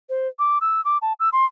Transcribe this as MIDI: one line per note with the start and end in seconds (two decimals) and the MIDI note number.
0.09 0.28 72
0.39 0.58 86
0.61 0.83 88
0.85 0.98 86
1.02 1.13 81
1.20 1.29 88
1.33 1.45 84